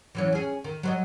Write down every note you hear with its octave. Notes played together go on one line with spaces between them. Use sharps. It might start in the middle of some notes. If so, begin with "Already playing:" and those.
E3 F#3 C#4
C#4 G#4
D#3
F#3 C5 D#5